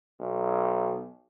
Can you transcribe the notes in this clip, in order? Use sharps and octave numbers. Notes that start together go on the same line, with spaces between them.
B1